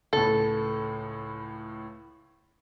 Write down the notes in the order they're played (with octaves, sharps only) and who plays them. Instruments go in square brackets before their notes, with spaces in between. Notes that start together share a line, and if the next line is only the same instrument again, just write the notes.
[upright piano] C#2 A2 [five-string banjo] A4